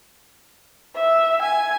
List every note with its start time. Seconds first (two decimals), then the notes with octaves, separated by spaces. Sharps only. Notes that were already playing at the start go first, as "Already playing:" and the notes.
0.95 E5
1.42 G#5